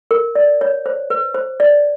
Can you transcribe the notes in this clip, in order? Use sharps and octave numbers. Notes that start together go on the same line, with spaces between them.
A#4
D5
C#5
C5
B4
C5
D5